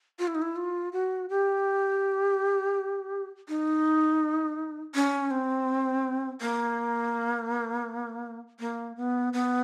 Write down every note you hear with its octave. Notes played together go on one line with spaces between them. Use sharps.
F4
E4
D#4
E4
F4
F#4
G4
D#4
C#4
C4
A#3
A#3
B3
B3